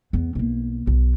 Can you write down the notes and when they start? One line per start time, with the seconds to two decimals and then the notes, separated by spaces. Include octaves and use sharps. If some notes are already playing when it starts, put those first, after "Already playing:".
0.13 E2 B3
0.35 B1 A#3
0.87 B1